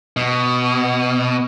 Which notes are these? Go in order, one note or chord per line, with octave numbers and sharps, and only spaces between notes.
B2